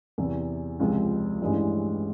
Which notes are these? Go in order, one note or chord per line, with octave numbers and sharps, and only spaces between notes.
E2 C3 E3
C#2 C3 F3 G#3
A1 G2 E3 G#3 C#4